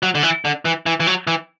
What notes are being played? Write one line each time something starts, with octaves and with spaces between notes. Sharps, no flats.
F#3
D3
E3
D3
E3
E3
E3
F#3
E3